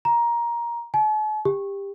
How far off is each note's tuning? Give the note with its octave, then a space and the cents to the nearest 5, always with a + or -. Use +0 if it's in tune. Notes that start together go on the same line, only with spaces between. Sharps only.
A#5 +15
A5 -45
G4 +20